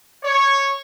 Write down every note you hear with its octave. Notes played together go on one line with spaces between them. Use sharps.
C#5